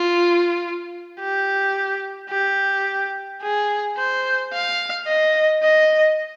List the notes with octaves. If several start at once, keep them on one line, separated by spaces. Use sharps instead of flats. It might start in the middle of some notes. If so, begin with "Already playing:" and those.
Already playing: F4
G4
G4
G#4
C5
F5
D#5
D#5